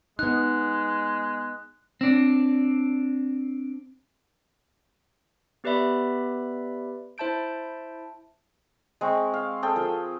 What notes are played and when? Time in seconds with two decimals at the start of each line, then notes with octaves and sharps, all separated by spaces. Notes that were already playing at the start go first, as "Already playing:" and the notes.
0.19 G#3 B3 D#4 F#6
2.01 C4 D4
5.64 B3 G4 B4 D5 E5 B5
7.18 E4 C5 E5 A5 G6 D7
9.01 G#3 C4 C#6
9.34 F5
9.62 C4 G#4 A4 G5
9.76 F3 A#4